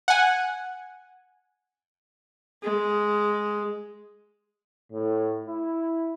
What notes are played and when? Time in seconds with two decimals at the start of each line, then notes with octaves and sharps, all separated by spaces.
0.08 F#5 G#5
2.63 G#3
4.92 A2
5.47 E4